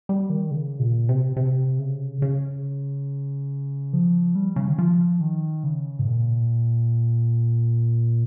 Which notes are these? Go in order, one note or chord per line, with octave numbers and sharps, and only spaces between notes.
G3
D#3
C#3
A#2
C3
C3
C#3
C#3
F3
G3
C#3
D#3
F3
D#3
C#3
G#2
A#2